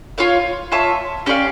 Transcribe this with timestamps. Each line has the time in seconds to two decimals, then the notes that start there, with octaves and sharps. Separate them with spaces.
0.18 F4 C#5 F5
0.72 F4 C#5 E5 A5
1.26 C#4 G4 D5 F5